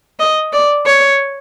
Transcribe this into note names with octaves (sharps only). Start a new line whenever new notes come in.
D#5
D5
C#5